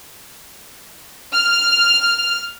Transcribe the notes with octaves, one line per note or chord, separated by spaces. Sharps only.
F6